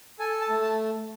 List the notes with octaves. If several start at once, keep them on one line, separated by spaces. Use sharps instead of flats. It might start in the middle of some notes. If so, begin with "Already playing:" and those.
A4 G#5
A5
A3
A5